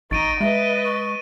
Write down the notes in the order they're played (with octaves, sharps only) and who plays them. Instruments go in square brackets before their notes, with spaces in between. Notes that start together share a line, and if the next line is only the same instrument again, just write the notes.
[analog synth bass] A1 [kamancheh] D#4 A#5 [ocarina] C#6 [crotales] A6 D7 D#7
[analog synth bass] G#3 [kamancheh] B4 D#5 [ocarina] E5
[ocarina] C#6